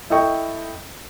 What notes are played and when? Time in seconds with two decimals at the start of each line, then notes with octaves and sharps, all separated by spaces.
0.10 E4 A4 D#5 G5 C#6